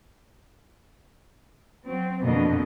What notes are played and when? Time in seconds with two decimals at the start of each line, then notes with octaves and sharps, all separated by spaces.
1.84 F#3 C4
2.23 F2 B2 D3 A#3 B3 D#5